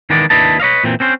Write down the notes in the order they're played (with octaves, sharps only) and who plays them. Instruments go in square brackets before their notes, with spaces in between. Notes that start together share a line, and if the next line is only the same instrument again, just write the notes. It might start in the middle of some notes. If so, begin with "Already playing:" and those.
[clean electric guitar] D#3 E3 G#3 B3 D5
D#2 D4 E4 B4 D#5 A5
B4 C#5 D#5 F5
A#2 E3 C4
C4 C#4 C5